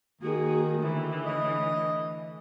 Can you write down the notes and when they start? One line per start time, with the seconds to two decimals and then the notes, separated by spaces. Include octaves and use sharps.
0.21 D#3 A#3 F#4 G#4
0.78 A2 D3 E3
1.26 D#5